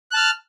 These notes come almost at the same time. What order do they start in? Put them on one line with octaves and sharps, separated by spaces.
F#6 A5 F6